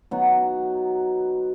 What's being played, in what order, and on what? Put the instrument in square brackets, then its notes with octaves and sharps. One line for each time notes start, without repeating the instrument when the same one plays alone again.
[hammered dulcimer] F#3 B3 D#4 F#4